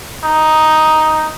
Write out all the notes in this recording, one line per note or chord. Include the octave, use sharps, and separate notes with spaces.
D#4